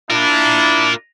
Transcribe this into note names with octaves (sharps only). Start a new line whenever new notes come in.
D4 E4 F4 A#4